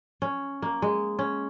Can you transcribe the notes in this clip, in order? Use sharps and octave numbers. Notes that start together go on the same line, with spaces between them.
C#4
A#3
G#3
C#4